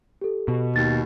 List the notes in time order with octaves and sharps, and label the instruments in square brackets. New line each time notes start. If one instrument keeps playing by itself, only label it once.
[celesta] G4 A4
[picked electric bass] B2
[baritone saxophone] D#2 [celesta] A6